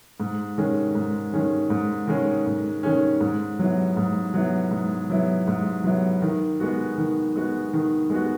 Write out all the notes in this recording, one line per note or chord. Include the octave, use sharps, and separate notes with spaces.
G#2
D#3 G#3 C#4
G#2
D#3 G#3 C#4
G#2
D#3 G#3 C#4
G#2
D#3 G#3 C#4
G#2
F#3 B3 E4
G#2
F#3 B3 E4
G#2
F#3 B3 E4
G#2
F#3 B3 E4
D#3
G#3 B3 F#4
D#3
G#3 B3 F#4
D#3
G#3 B3 F#4